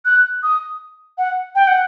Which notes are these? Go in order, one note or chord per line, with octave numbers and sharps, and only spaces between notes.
F#6
D#6
F#5
G5
F#5